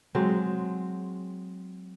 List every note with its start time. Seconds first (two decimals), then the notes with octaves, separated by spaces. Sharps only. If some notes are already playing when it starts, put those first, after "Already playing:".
0.15 F#3 G#3 C4